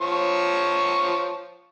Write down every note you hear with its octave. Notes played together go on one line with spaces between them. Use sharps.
F3 C#5 C#6